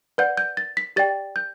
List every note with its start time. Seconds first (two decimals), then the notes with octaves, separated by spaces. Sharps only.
0.18 B4 D5 F#5 G6
0.37 G6
0.57 A6
0.77 B6
0.96 G4 D5 G5 A6
1.36 G6